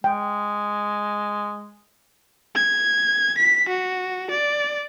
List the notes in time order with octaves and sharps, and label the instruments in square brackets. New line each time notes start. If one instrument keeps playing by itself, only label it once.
[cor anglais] G#3 [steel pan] G5
[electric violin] G#6
B6
F#4
D5